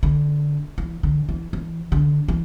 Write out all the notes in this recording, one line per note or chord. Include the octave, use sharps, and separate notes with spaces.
D3
E3
D3
E3
E3
D3
E3